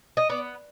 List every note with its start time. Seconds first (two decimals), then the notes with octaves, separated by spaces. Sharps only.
0.17 D#5
0.29 B3 D5